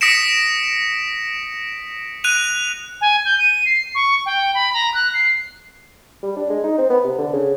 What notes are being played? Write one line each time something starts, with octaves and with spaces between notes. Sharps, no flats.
D#6 A#6 B6 C#7 D7 E7
F#6 D#7 F7
G#5
G6
D#7
C7
C#6
G5
B5
A#5
F#6
C7
G3
D4
G#3
D#4
C4
B3
C3
D3
C#3